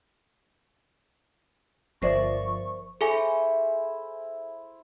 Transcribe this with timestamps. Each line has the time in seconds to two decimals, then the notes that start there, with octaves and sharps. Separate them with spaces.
2.02 G1 F3 A#4 C5 D5 E5 C#6
3.01 E4 G#4 A4 C5 G#5